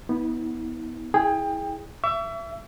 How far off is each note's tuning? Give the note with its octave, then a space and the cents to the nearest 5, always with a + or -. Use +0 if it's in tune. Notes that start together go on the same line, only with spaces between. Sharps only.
B3 -5 E4 -45
E4 -20 G#4 +0 G5 +25
E5 +25 C#6 +45